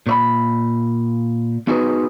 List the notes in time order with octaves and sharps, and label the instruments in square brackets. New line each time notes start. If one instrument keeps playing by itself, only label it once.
[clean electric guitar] A#2 C#5 B5
B3 D#4 F#4 G#4 B4 C5